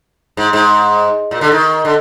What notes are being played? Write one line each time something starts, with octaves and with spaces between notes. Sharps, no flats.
G#2
G#2
A#2
D3
D#3
D3